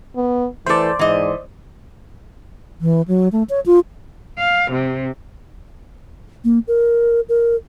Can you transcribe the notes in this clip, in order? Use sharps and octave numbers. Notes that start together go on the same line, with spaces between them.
B3
E3 A3 A4 C5 D5
G#2 E3 D#5
E3
F#3
A3
C#5
F4
F5
C3
A#3
A#4
A#4